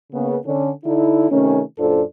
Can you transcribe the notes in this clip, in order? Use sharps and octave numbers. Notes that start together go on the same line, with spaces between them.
C#3 A#3 B3
D3 C#4
D3 D#4 E4
C3 D#3 A3 C#4
F#2 A#2 D4 F4 A4 C5